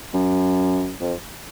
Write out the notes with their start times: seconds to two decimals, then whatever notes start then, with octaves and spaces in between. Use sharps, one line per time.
0.14 F#2
1.01 F2